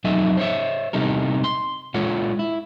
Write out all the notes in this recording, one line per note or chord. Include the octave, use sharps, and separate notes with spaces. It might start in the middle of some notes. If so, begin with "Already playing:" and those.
F2 F#3 D#4 A4 D#5 E5
C5 C#5 E5
C3 G3 D#4 A4 A#4
C6
G#3 F4 A4 C#5 F#5
E4